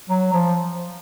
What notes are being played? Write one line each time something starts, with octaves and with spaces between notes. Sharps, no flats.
F#3
F3